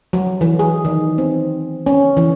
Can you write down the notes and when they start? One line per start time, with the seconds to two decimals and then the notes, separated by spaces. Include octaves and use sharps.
0.13 F#3
0.41 E3
0.59 G#4
0.85 D#3
1.18 C4
1.86 C#4
2.17 E3